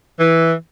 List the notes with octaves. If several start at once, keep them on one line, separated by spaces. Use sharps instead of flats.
E3